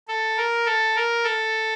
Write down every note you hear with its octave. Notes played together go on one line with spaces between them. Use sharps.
A4
A#4
A4
A#4
A4